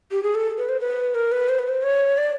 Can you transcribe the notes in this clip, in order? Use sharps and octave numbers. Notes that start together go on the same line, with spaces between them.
G4
G#4
A4
B4
C5
B4
A#4
B4
C5
B4
C5
C#5
D5